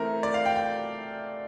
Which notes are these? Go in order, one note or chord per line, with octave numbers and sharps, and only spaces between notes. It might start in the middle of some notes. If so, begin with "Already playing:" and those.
Already playing: E3 A3 C4 A#4
D5
F5
G5
G5